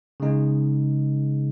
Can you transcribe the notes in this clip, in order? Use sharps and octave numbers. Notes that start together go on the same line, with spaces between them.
C#3 G#3 D#4